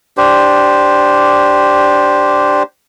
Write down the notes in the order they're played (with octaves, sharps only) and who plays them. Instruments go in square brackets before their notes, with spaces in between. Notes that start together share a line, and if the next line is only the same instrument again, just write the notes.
[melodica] D4 G4 C5